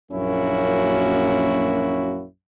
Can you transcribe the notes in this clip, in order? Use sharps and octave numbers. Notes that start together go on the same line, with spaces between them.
A#1 F#2 A#3 C#4 E4 F#4